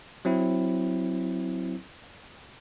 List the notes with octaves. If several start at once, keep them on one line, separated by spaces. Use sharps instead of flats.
F#3 C4 E4